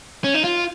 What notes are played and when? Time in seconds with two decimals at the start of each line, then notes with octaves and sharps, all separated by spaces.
0.24 C#4
0.34 D#4
0.44 F4